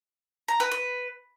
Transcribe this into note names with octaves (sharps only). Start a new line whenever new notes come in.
A#5
B4
B4